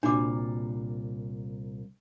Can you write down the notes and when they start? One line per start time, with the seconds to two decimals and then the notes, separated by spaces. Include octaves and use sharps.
0.03 C2 A#2 D4 F#4 D6